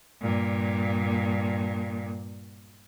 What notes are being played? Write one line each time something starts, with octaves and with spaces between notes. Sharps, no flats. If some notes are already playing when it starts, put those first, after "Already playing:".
G2 A#2